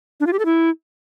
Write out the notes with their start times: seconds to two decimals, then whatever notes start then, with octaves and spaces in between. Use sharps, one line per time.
0.20 D4
0.27 F4
0.33 G4
0.39 A4
0.45 E4